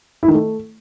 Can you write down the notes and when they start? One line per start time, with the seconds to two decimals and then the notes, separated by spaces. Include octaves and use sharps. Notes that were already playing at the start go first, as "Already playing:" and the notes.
0.23 E4
0.28 D#3
0.33 A3